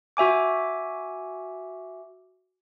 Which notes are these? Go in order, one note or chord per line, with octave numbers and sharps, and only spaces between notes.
F#4 E5 G#5 D6